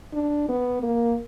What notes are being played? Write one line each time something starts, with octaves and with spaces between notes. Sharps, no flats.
D4
B3
A#3